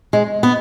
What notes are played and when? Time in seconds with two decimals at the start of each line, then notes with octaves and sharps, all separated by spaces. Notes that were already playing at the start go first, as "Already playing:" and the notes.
0.13 G#3
0.43 B3